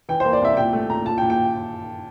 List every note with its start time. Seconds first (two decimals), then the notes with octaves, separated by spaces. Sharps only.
0.09 E3 G5
0.20 C5
0.25 A#3
0.33 D5
0.42 C2 E5
0.57 A#2 G5
0.73 A3
0.90 A#2 A#5
1.06 A#2 A5
1.18 G5
1.22 A#2
1.30 G5